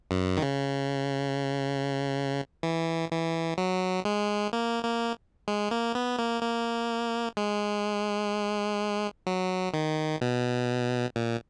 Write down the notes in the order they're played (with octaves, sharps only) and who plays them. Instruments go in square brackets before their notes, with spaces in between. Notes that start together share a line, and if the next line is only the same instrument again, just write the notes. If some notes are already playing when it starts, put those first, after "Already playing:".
[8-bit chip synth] F#2
D#3
C#3
E3
E3
F#3
G#3
A#3
A#3
G#3
A#3
B3
A#3
A#3
G#3
F#3
D#3
B2
A#2